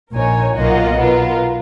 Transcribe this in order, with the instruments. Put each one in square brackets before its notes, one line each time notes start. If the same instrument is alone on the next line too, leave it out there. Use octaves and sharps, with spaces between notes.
[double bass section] A#1 A#2 [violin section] D#4 A#4 C#5 G#5
[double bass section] B1 B2 [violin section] A#3 F4 A#4 D#5 F#5
[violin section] B3 F4 A#4